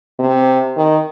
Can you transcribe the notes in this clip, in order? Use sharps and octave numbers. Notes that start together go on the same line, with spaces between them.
C3
D#3